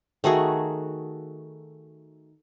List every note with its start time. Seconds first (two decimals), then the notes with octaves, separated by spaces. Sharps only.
0.24 D#3 A3 F#4 G#4